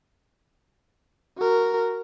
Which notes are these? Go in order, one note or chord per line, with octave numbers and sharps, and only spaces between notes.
F#4 A#4